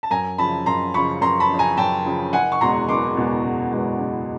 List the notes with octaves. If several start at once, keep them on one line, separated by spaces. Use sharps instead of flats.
A5
F#2 G#5 A#5
C#3 F3 A5 B5
F#2 A#5 C6
C#3 F3 B5 C#6
F#2 A#5 C6
A5 B5
C#3 F3
G#5 A#5
F#2 G5 A5
C#3 F3
F#1 F#5 G#5
C#6
E2 B2 G#3 B3 A#5 C6
F#1 C6 D6
E2 B2 G#3 B3
F#1
E2 B2 G#3 B3
F#1